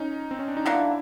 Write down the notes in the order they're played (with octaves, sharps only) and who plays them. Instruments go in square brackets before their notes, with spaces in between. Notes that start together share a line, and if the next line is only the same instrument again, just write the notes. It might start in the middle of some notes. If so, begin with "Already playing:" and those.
Already playing: [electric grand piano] C#4 D#4
C4
C#4
D4
D#4
[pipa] D3 F#3 A#3 [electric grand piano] D4 E4